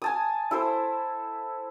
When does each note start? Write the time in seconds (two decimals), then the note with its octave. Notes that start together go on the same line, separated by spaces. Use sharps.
0.02 G#5 A5 D#6
0.51 E4 A4 C5